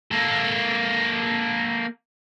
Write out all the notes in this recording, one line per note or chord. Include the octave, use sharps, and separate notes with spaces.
A#3 A4